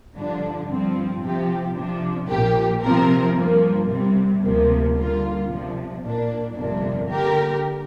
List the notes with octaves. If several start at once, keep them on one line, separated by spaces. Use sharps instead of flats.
G2 D3 F3 D4
G2 F3 C4
C3 F3 C4 G4
C3 F3 D4
A#1 A#2 F3 A#3 G4
C3 F3 C4 A#4
G2 F3 A#3
C2 C3 G3 C4
D2 C3 F3 A#3
D3 G3 A#3 F4
C3 F3 D4
A#2 A#3 D4
G1 F2 C3 A#3 D4
D3 A#3 G4 A#4